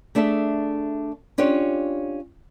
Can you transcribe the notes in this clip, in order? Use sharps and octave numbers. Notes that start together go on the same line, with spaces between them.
A3 D4 G#4 A4 E5
C#4 D4 F4 G4 C#5